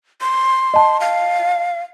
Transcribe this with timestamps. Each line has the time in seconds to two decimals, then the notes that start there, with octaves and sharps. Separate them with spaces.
0.21 C6
0.74 D#5 A5
1.00 F5